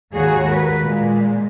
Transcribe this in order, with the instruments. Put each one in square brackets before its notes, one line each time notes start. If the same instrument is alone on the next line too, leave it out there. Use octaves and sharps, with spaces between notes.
[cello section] D#2 G#2 G#3 F#4 G#4 C#5
A#4 B4
A#2 G#3